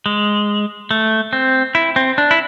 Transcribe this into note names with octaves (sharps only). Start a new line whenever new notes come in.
G#3
A3
C4
E4
C4
D4
E4